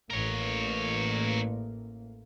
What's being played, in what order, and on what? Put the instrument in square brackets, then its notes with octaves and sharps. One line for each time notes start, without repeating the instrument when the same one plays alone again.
[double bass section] A1 A#3 [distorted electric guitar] A#4 C#5